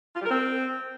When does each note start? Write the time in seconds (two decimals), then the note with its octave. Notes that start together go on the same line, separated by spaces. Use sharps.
0.15 F4
0.20 G3
0.25 A#4
0.30 C4